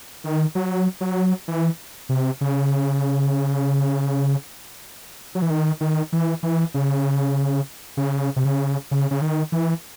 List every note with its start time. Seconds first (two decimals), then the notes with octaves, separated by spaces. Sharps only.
0.24 D#3
0.55 F#3
1.01 F#3
1.48 E3
2.09 C3
2.41 C#3
5.35 F#3
5.42 E3
5.50 D#3
5.81 D#3
6.13 E3
6.43 E3
6.74 C#3
7.97 C#3
8.36 C3
8.45 C#3
8.91 C#3
9.11 C#3
9.21 D#3
9.52 E3